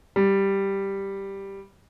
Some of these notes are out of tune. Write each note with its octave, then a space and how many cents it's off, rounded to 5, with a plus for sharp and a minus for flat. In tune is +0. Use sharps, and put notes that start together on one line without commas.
G3 +0